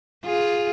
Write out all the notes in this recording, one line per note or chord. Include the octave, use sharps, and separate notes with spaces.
F4 G#4